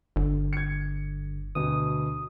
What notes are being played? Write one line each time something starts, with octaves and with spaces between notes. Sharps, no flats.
G1 D3
G#6 C#7
D2 B2 D#6